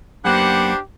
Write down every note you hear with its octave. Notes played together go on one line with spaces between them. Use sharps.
F#2 A#3 B3 D4 G4 C5 F#5